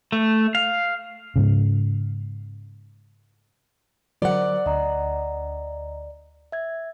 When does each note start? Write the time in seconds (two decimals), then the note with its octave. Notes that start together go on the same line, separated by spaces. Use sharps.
0.12 A3
0.55 F5
1.36 G#2 C#3
4.22 D3 F#3 A#4 C5 D5 F#5 D6
4.66 D2 D#5 A#5
6.52 E5 G#6